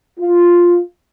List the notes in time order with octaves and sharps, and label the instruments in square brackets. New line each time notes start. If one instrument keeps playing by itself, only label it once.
[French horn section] F4